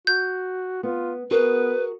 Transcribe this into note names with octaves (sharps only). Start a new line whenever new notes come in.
F#4 G6
B3 F4
B3 F#4 G#4 A#4 B4